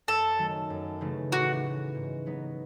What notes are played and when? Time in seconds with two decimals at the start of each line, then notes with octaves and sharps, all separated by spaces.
0.07 F#2 A4
0.39 D#3 F#3 A3
0.70 F#2
1.01 C#3 E3 A3 D#4
1.32 A2 F#4
1.63 E3 A3
1.95 G#2
2.26 F#3 B3 D#4